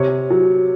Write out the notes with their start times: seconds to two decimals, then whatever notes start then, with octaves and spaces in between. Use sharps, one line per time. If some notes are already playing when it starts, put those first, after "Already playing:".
Already playing: C3 C#5
0.30 F#3